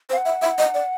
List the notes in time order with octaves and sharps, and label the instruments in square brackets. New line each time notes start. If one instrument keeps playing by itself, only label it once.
[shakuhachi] C5
[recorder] F5
F#5
[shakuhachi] E5
E5
D#5
D5